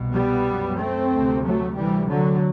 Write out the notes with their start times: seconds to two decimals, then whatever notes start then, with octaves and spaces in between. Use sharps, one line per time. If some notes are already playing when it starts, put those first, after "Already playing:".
Already playing: C2 B2
0.15 G3 B3
0.47 F#2
0.79 A3 C4
1.12 D2 C3
1.44 F#3 A3
1.76 D2 C3 E3 G3
2.08 D3 F#3